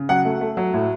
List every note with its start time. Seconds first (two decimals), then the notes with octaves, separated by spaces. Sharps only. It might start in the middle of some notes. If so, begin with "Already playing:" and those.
Already playing: C#3
0.09 F#3 F#5
0.25 A3
0.41 A3
0.57 F#3
0.74 A2